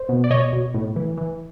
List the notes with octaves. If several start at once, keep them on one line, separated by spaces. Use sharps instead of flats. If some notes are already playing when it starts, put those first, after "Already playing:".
Already playing: C5
B2
D5
B2 C#5 D#5
B2
A2
E3
E3